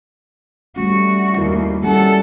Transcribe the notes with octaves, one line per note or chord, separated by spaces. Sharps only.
G3 A3 C#4 F#4
D#2 E4 F#4 A#4
G3 C#4 A4 F#5